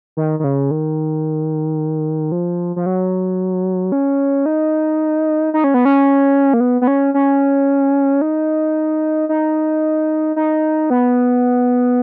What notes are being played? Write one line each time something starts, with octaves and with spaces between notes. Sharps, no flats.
D#3
D#3
C#3
D#3
F3
F3
F#3
C#4
D#4
D#4
C#4
B3
C#4
A#3
B3
B3
C#4
C#4
D#4
D#4
D#4
B3